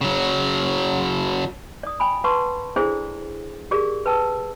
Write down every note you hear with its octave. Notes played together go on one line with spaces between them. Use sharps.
C#3 F#3
D5 D#6
G5 G#5 B5
B4 F#5 A5 C6 C#6
D4 E4 G#4 A4 C5 D5
G4 G#4 A#4 D5
B4 G5 A5 E6